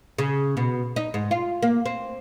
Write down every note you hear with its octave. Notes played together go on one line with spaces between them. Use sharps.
C#3
B2
D#4
G#2
F4
A#3
C4